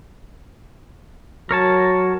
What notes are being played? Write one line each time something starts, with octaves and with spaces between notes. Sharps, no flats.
F#3 A#4 C#5 A5